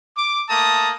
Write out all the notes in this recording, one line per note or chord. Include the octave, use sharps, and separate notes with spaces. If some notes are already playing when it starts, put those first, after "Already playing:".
D6
A3 A#3 A5 A#5 D#6